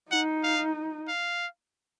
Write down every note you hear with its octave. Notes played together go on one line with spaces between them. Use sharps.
D#4 F#5
F5
F5